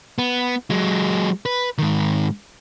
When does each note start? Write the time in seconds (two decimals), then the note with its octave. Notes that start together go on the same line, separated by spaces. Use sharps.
0.18 B3
0.70 F#3 G#3
1.46 B4
1.78 G#2 D#3